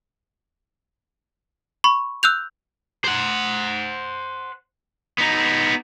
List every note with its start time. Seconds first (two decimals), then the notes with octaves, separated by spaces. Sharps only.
1.84 B5 C#6
2.23 E6 F#6 G6 F7
3.04 C5 F#5
5.18 B3 D#4